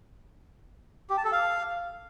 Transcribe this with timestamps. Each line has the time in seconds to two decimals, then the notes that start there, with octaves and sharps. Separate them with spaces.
1.10 G4
1.17 A5
1.25 A4
1.32 F5